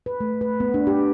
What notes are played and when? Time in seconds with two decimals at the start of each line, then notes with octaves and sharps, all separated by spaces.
0.06 B4
0.20 A3
0.41 B4
0.60 B3
0.74 D4
0.87 G4